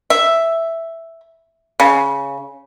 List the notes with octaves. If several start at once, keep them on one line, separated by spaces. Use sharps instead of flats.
E5
C#3